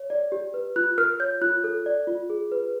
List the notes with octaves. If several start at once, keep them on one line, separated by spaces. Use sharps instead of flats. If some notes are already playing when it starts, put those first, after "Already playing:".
Already playing: C#5
D5
G4
B4
F4 F#6
A#4 F6
C#5 G6
F4 F#6
A4
D5
F4
G#4
B4